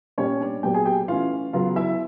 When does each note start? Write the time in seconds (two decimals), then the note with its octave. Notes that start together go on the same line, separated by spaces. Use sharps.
0.18 A#2 G3 B3 C#4 C#5
0.41 D4 D5
0.63 A#2 F#3 B3 G4 G5
0.74 G#4 G#5
0.85 G4 G5
1.08 E3 A3 C#4 F4 F5
1.53 C#3 F#3 B3 F4 F5
1.76 E4 E5